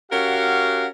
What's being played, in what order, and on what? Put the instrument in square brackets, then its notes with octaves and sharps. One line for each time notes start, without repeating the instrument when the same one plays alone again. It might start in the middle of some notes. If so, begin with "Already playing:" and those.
[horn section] C#4 F#4 G4 A#4 F5 F#5